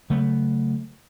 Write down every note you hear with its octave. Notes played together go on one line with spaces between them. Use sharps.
C#3 F#3 A3 B3